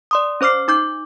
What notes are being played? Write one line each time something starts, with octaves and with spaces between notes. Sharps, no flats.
D5 C6 D#6
C#4 C5 D6 F6 C7
D#4 D6 G6